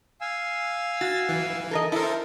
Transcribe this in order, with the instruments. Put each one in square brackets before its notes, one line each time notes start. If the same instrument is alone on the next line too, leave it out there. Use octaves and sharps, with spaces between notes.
[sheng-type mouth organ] F5 G#5 E6
[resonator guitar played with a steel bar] F#4 [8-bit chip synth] A6
[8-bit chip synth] E3
[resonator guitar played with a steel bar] A4 A#4 D#5
[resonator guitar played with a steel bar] E4 C5 [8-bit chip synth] A4 A#4